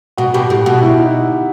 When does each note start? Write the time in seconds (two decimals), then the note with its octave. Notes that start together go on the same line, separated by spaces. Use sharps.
0.17 B2 F#4
0.34 B2 G4
0.50 A2 G4
0.66 B2 F#4
0.81 E4
0.99 D#4